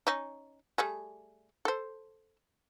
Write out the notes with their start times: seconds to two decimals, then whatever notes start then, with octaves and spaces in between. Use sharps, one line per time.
0.07 C#4 D#4
0.78 G3 A3 G#4
1.65 A4 C5